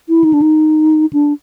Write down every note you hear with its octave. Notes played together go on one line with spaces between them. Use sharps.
E4
D#4
D4
D#4
D4